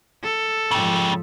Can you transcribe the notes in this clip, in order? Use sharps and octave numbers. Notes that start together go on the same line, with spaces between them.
A4
G#2 C#3 F3 G4